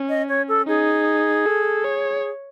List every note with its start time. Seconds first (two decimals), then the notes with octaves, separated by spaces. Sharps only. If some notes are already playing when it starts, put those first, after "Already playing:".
Already playing: C#4
0.09 D#5
0.29 C#5
0.48 A4
0.67 D#4 G#4
1.46 A4
1.84 C#5